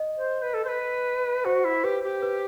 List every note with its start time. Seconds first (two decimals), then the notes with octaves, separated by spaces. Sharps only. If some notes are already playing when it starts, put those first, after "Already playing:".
Already playing: D#5
0.17 C5
0.42 B4
0.54 A4
0.65 C5
0.68 B4
1.45 F#4 C5
1.64 E4
1.84 G4 B4
2.03 G4
2.22 B4